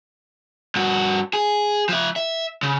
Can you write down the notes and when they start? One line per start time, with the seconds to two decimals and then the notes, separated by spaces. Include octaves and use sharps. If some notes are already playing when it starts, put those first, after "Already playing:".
0.76 G2 F#4
1.33 G#4
1.89 F3 E5
2.16 E5
2.63 C#3